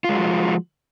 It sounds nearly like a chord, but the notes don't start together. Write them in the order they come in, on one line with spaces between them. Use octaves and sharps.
F4 G#3 F#4 F3